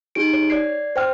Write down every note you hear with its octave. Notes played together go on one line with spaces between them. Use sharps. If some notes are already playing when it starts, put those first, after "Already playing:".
D#4 G4 G#4 D7
C#5
D5 G#6 C7
C5 G5 F6